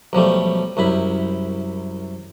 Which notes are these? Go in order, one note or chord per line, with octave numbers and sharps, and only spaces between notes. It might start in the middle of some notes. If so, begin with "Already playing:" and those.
B1 F3 G3 A3
C2 F#2 E4 B5